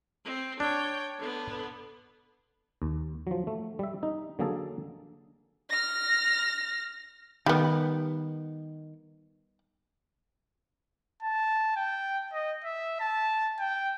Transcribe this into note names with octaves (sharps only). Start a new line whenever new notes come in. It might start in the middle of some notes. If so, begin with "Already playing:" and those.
C4
D4 C#5 G5
D3 B3
D#2
F3 F#3
A3
G3 E5
D#4
D3 F#3 A#3 G#4 A4
F6 A#6
D#3 G3 B3
A5
G5
D#5
E5
A5
G5